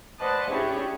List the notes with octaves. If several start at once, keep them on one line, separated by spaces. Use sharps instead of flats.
B4 C5 D5 D#5 F#5 A5
C#4 D4 E4 G4 G#4 C#5